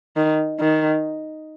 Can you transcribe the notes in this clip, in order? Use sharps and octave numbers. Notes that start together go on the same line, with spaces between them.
D#3
D#3